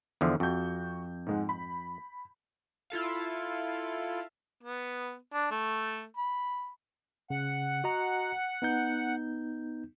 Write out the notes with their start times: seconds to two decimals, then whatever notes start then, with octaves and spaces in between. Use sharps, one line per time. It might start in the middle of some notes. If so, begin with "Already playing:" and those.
0.21 E2 D3 F3
0.40 F2 F#4 G6
1.26 G#2 G#3 F#5
1.49 B5
2.90 E4 F4 A4 F5
4.63 B3
5.33 D4
5.51 A3
6.17 B5
7.30 C#3 F#5
7.84 F#4 D#5 A#5
8.62 B3 D#4 G6